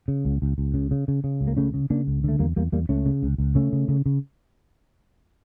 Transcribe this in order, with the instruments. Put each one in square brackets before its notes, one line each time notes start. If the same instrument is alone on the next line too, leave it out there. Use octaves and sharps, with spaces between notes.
[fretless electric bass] C#3
C#2
C#2
C#2
C#3
C#3
C#3
C#3
C#2
A#3
C#3 A3 C#4
C#3
C#3 A#3 D4
C#2
D3 A3
E2 G3 A#3
E2 G3 A#3
E2 G3 A#3
C#2 A3 C#4
C#3
C#2
C#2
C#3 A3 C#4
C#3
C#3
C#3